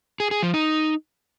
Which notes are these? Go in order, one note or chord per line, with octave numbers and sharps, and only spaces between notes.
G#4
G#4
F3
D#4